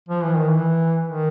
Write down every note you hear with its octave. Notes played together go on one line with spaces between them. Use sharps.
F3
E3
D#3
E3
D#3